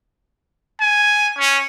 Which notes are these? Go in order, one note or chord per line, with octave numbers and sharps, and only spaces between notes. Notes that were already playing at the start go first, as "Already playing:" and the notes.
G#5
C#4